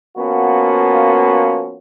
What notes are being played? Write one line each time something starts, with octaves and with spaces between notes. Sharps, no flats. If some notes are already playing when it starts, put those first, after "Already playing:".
F3 A#3 B3 C#4 F#4